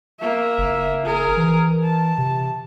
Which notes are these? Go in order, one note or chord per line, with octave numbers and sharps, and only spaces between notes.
A#3 E5
F#1
G#4 A#4
E3
A5
C3